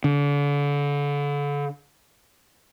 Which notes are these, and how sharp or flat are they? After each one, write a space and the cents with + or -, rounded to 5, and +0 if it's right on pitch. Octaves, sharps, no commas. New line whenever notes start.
D3 -35